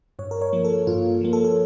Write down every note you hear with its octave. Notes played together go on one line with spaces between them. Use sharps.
G2 C#5
A#4
C#5
F3 A#3
A4
G2 F4
F3 A#3
A4
A4